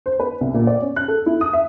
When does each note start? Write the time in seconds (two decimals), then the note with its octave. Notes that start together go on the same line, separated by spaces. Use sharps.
0.06 C5
0.20 B4
0.41 C2
0.54 A#2
0.67 D5
0.81 C#4
0.96 F#6
1.08 A4
1.26 E4
1.41 D#6
1.53 E5